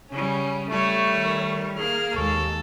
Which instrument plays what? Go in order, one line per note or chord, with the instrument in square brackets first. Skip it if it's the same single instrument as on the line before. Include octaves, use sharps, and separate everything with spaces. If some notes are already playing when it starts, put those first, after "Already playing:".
[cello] C#3 G3 [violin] C#4
[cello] G3 C#5 [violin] A3 [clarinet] C#6
[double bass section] D#3
[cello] A#3 [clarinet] G#4 [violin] F6
[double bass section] D#2 G#3 [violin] A4 [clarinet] C#6